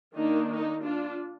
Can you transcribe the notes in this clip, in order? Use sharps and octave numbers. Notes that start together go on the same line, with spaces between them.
D#3 A#3 D4 D#4
D#4
D4 F4